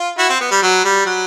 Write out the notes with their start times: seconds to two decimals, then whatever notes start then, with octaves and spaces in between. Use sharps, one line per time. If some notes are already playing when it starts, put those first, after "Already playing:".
Already playing: F4
0.18 E4 F#4
0.29 C4
0.40 B3
0.51 G3
0.62 F#3
0.84 G3
1.06 F#3